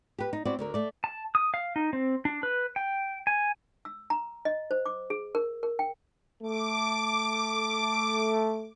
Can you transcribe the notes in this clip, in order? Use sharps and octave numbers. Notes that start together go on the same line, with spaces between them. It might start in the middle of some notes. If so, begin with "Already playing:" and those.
G4 B4
D#4
C4 E4 F#4 D5
D2 D3 A#4
A3 D5
A5
D#6
F5
D#4
C4
D4
B4
G5
G#5
E6
A#5
D#5
C5
D6
G#4
A#4
A#4
G5
A3 D6